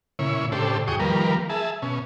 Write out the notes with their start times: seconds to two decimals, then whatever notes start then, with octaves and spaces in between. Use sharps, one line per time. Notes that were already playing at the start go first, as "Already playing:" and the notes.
0.19 A#2 C#3 E4 C#5
0.52 A2 C#3 D4 G4 A4 C5
0.88 E2 F#4 G#4 G5 C#6 D#6
0.99 D#3 F3 G3 A#3 A#4 B4
1.50 G#4 E5 A5
1.82 B2 C#4